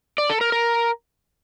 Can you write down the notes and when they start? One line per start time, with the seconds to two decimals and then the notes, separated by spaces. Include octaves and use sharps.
0.18 D5
0.30 A4
0.41 A#4
0.52 A#4